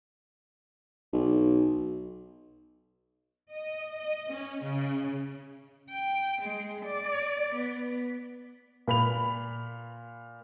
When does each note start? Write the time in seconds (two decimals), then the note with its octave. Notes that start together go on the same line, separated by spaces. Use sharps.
1.13 B1
3.51 D#5
4.00 D#5
4.32 C#4
4.62 C#3
5.91 G5
6.41 G#3
6.85 D5
7.55 B3
8.88 A#2 B5 F7